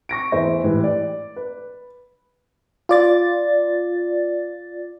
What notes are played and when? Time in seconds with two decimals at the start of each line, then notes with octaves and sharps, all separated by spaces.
0.09 C#6 A#6 D7
0.32 E2 E3 G#4 C5 E5
0.64 A2 E3 G#3 G4
0.84 D5
1.36 B4
2.89 F4 D5 A6